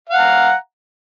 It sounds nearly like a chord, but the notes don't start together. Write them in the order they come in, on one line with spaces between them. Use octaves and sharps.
F5 F#5 A#5